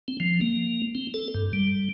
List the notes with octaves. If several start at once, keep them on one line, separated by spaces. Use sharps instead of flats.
C4
F3
A#3
C4
A4
G2
G3